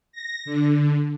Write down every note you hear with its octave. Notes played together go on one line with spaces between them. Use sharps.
A#6
D3